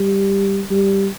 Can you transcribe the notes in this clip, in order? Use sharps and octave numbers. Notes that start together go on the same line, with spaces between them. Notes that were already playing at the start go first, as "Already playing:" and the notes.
Already playing: G3
G3